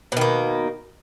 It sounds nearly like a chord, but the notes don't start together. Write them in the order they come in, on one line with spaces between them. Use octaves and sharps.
B2 D#3 A#3